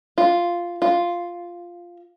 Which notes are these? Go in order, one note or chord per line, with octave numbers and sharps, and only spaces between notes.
F4
F4